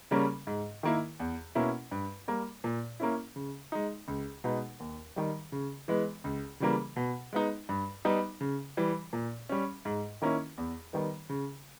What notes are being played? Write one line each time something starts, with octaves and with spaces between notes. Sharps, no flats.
C#3 G3 A#3 C#4
G#2
D#3 A#3 E4
E2
B2 A#3 C#4 E4
G2
G3 A#3
A#2
A#3 C#4 E4
C#3
G#3 D#4
C#2
B2 G#3 B3 D#4
D#2
D#3 G3
C#3
E3 G#3 B3
C#2
C#3 E3 G3 A#3
B2
G#3 B3 D#4
G2
G3 B3 D#4
C#3
E3 G3
A#2
G3 C#4
G#2
D#3 A#3 C#4 E4
E2
D#3 G3 B3
C#3